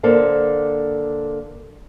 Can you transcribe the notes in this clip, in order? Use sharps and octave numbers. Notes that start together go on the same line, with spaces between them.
D3 A#3 A4 C5